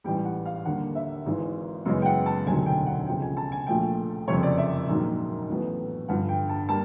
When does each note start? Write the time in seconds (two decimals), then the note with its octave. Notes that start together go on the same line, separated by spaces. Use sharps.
0.04 A1 G#2 E3 G3 G5
0.25 F#5
0.46 F5
0.65 D#2 D3 G3 A#3 F#5
0.95 E5
1.26 G#1 G#2 E3 G#3
1.86 F#2 C#3 E3 G#3 B3
2.02 G5
2.06 F#5
2.26 A5
2.46 E1 D2 C3 D#3 F#3 G#5
2.66 G5
2.87 F#5
3.07 C#2 C3 F3 G5
3.22 G#5
3.37 A5
3.52 G#5
3.67 A#1 A#2 F3 A3 G5
4.28 F#1 F2 C3 C#5
4.43 D5
4.58 E5
4.88 A#1 G#2 D#3 F#3 A#3
5.49 A1 A2 F#3 B3
6.08 G2 D3 F3 F#5
6.29 G5
6.49 A5
6.69 G3 A#3 A5